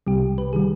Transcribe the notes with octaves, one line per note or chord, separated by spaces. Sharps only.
C2 C3 G3 G4
B4
D#3 G3 G#4